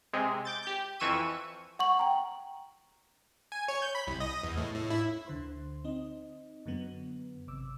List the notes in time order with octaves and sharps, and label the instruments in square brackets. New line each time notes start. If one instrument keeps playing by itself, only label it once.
[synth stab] C3 G#3
D6 G6 A6
G4 G6
F2 E3 C#6 E6 D#7
[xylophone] F#5 C#6 F#7
G5 A#5
[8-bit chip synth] G#5
C#5
G6
B5
C2
D#5
E2
A2
A2
E4
[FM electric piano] D2 D3 C5 C6
C4 D#4 D#5
F#2 D3 F#3 B3
G#1 C3 D6 E6